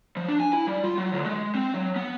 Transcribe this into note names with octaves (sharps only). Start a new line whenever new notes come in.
F3
D4
G#5
E4
G3
F4
F#3
D2
G#3
C4
F#3
B3